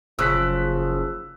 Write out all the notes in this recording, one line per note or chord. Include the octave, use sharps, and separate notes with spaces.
F#1 C#3 F3 E6 F#6 B6